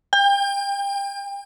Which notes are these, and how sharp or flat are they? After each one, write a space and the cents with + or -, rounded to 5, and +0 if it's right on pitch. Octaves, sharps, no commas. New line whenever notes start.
G5 +35